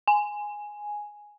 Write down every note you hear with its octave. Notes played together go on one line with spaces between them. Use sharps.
G#5